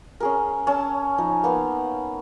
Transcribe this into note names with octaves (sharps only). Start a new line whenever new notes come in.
C#4 G#4 A#4
C#4 A5 E6
F3 D#4
A#3 B3 D#4 F5